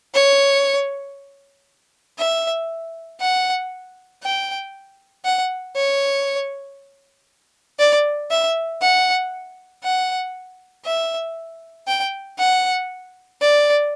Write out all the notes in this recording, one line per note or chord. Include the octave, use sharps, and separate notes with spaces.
C#5
E5
F#5
G5
F#5
C#5
D5
E5
F#5
F#5
E5
G5
F#5
D5